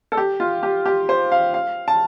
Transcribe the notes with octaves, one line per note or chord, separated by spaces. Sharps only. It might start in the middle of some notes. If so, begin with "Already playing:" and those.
A4
G4
F4
G4
G4
C5
F5
F5
A5